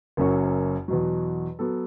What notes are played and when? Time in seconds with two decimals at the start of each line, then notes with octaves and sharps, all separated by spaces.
0.17 F#1 F#2 F#3 C#4 F#4
0.88 E2 B2 F#3
1.59 F#3 B3 A4